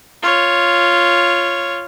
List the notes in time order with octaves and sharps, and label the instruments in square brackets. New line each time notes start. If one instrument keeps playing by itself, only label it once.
[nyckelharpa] F4 C#5